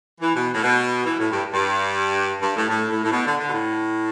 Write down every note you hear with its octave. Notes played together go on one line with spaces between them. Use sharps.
E3
B2
A2
B2
E3
A2
G2
G2
G2
A2
A2
A2
A2
B2
D3
D3
B2
A2